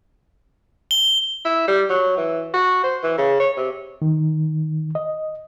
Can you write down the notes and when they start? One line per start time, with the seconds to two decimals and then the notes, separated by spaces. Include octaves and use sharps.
0.91 G7
1.45 E4
1.68 G3
1.90 F#3
2.17 E3
2.54 F#4
2.84 C5
3.03 E3
3.18 C#3
3.40 C#5
3.57 C3
4.02 D#3
4.95 D#5